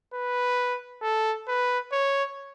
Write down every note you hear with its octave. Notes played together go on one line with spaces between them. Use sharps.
B4
A4
B4
C#5